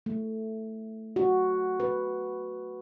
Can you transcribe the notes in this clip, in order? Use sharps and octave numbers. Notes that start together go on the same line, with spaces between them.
A3
F#4
B4